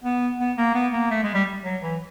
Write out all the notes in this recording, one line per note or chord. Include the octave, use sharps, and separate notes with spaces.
B3
B3
A#3
B3
A#3
A3
G#3
G3
F#3
E3